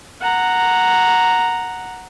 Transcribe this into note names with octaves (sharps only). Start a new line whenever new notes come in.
F#5 A#5